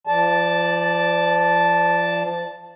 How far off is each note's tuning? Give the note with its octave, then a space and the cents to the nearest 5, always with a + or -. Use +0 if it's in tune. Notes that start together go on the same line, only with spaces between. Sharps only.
F3 -35 D5 +0 A5 -5